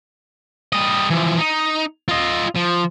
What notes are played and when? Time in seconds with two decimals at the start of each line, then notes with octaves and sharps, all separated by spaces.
0.73 G3 D#5
1.11 E3 F3
1.39 D#4
2.08 F4 D#5
2.56 F3